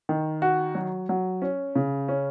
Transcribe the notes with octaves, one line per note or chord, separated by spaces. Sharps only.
D#3
F#4
F#3
F#3
C#4
C#3
C#4